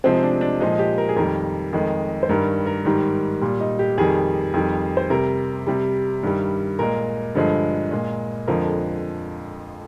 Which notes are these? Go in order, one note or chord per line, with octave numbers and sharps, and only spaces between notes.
C3 F3 G#3 C4
D#4
D4
D4
A#2 F3 G#3 D#4
G4
A#4
G#4
F2 D#3 G3 A#4
F2 D#3 G#3
C5
G2 D#3 G3 A#4
A#4
G#2 D#3 G3
A#2 G3
D#4
G4
F2 D#3 G3 G#4
F2 D#3 G3
C5
C3 G3 A#4
C3 G3
G2 D#3 G3
A#2 G#3 A#4
G2 D3 F3 G#3
A#2 G#3
F2 D3 F3 G#3 A#4